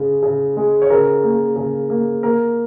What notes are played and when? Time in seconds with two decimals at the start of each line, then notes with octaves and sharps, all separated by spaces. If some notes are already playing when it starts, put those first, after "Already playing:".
Already playing: C#3 G#3
0.23 C#3
0.57 G#3
0.82 C#5
0.90 C#3 A#4
1.24 A#3
1.56 C#3
1.90 A#3
2.23 A#3 A#4